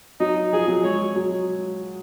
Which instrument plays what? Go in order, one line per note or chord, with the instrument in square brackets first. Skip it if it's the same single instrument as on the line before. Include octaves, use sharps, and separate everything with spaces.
[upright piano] F#3 [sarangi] D#4
[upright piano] F3 [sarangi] G#4
[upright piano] F#3
[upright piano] G#3 [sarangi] C#5
[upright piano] F#3